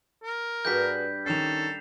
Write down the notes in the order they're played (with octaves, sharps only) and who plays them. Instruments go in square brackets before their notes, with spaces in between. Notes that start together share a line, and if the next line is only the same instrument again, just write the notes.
[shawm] A#4
[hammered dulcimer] G2 B4 G5 [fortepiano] F#4 G#4 [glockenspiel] G6 B6
[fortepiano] D#3 C#4 [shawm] A4 [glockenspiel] C7 E7 F7